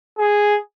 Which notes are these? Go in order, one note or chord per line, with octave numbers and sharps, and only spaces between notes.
G#4